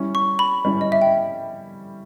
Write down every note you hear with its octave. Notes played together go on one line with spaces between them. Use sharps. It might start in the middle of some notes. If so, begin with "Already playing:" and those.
Already playing: G3 C#4 E4
C#6
B5
G3 C#4 E4
D#5
E5
G5